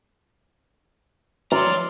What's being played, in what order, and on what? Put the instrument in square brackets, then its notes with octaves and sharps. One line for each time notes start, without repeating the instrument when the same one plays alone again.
[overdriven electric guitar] C#5 A#5 [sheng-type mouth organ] D5 F6 [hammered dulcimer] C6